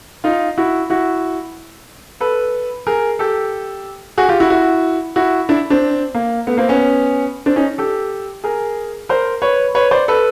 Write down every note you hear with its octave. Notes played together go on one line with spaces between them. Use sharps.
D#4 F4
E4 F#4
E4 F#4
A4 B4
G#4 A#4
G4 A4
F#4 G#4
F4 G4
E4 F#4
E4 F#4
E4 F#4
D4 E4
C4 D4
A#3
A3 B3
A#3 C4
B3 C#4
C4 D4
C#4 D#4
G4 A4
G#4 A#4
A#4 C5
B4 C#5
B4 C#5
C5 D5
A4 B4